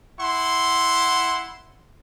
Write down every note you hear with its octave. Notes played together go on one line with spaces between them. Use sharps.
E4 F#5 C6